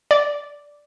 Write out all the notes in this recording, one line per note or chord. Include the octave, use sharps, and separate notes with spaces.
D5